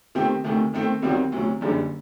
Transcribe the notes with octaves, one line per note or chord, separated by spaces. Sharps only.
C3 D#3 A3 C4 G4
D2 C3 D#3 A3
D#3 A3 C4
C2 C3 D#3 F#3 C4
D2 C3 F#3
F#1 F#2 D3 G3 D4